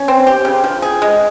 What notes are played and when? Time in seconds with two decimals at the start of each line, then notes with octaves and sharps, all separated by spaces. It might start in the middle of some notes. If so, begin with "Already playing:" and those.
Already playing: C#4
0.08 C4
0.27 G4
0.45 C#3
0.64 F3
0.82 G#4
1.02 G#3